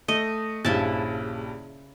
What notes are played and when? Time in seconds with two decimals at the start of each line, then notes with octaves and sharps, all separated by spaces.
0.08 A3 D#5
0.65 A#1 G2 C#3 E4 A5